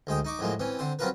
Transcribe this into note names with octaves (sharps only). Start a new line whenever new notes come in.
D2 G#3 G5 D#6
D#4 C#6 D6
F2 A2 F#3 G#3 A#3
E3 C4 C#4
D3 C4 C5
F#3 C4 C#4 F4 A#4 B4